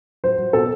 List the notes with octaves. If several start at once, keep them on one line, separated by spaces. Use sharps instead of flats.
F#3 C5
F#3
B2 A4